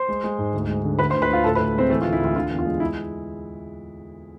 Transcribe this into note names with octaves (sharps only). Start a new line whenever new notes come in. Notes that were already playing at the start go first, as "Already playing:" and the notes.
Already playing: C5 C6
G#3
G#3
G#2
D2
G#3
D3
D2 B4 B5
C5 C6
D2
B4 B5
D2 F4 F5
A2 A4 A5
B4 B5
A2
G#3 C4 C5
E3 A3 A4
F4
D2
E4
D2 F4
D3 F4
E2
F4
G#3
E4